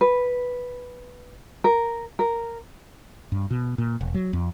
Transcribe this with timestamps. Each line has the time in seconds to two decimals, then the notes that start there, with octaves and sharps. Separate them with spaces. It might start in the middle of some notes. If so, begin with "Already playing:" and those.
0.01 B4
1.64 A#4
2.19 A#4
3.32 G2
3.51 B2
3.78 A#2
4.01 E1
4.14 F#3
4.33 F2